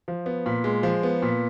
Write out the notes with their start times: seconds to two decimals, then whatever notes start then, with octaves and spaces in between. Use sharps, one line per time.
0.08 F3
0.26 B3
0.46 A#2
0.64 G#3
0.83 F3
1.03 B3
1.22 A#2